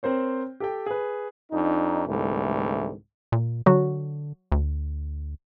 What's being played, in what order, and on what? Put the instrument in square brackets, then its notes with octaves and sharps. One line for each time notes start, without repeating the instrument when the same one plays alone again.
[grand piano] C4 A#4 C5 C#5
G4 A4 G5
G#4 B4
[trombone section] F2 D4 D#4
C2 G#2 D3 E3 A3
[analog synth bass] A#2
[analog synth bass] D3 [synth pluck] F#3 F#4
[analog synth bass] D2